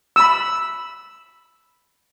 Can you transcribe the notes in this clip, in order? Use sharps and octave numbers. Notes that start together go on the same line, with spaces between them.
B5 E6